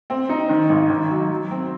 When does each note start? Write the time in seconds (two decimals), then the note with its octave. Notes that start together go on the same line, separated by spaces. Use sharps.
0.10 C4
0.29 D#4
0.49 D#3
0.69 G#1
0.89 D#3
1.10 F#3
1.30 F#3
1.51 C4